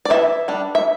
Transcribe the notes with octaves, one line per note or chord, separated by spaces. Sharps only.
D5
E3 E5
G3 D4
E5